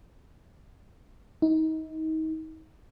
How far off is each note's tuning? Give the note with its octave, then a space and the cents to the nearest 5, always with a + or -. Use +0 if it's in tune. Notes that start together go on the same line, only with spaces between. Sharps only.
D#4 +30